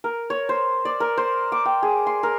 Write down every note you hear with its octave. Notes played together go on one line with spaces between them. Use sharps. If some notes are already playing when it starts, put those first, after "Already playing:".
A#4
C#5
C5
D5
A#4
C5
D6
G5
G#4
C6
A#4